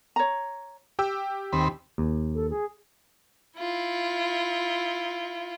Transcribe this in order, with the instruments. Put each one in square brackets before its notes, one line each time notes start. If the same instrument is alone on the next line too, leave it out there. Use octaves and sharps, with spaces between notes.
[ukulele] C#5 A#5
[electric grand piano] G4 G5 E6
[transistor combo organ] D#2 C4 B5
[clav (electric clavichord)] D#2
[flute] A4
G#4
[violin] E4 F4